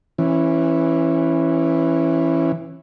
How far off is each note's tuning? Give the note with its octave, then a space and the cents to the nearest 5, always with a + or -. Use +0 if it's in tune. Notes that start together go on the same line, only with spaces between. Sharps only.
E3 +0 C#4 -25